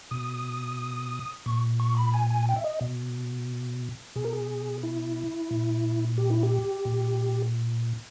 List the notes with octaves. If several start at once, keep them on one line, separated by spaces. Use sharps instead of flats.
B2 D#6
A#2 C#6
C#6
B5
G#5
G#5
G5
E5
D#5
B2
B2 G#4
A#4
G#4
E4
A#2
G4
E4
G4
A#2